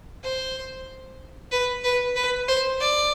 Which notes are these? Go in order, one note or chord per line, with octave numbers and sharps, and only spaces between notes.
C5
B4
B4
B4
C5
D5